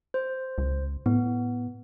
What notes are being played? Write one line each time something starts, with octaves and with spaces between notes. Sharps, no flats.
C5
C#2
A2 B3